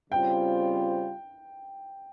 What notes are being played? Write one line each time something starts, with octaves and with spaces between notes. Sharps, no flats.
C#3 G3 C4 F4 C5 G5